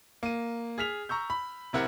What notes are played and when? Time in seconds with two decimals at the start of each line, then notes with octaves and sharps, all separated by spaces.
0.23 A#3 D#7
0.78 G#4 F6 B6 F7
1.09 A#5 C#6 E6 G6
1.30 B5
1.73 B1 C3 E4 A#4 F#5